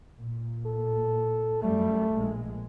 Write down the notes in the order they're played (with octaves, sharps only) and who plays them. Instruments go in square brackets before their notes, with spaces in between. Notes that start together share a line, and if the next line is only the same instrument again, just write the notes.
[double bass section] A#2
[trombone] A4
[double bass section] F#2 G3 [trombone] A3
[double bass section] A#1 G#3